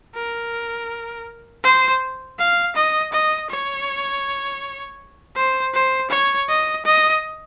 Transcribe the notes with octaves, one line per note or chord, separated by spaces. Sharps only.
A#4
C5
F5
D#5
D#5
C#5
C5
C5
C#5
D#5
D#5